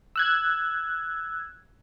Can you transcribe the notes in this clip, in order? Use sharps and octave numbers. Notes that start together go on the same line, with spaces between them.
E6 F#6 G#6